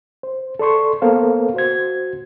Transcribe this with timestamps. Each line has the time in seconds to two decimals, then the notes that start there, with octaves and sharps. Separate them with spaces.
0.23 C5
0.59 A4 D5 C6 C#6
1.02 A#3 B3 A4 A#4 C5 F5
1.54 F#4 C5 G#6